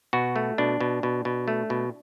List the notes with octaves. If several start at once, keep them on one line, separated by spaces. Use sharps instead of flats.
B2 F#4
A3
B2 D4
B2
B2
B2
A3
B2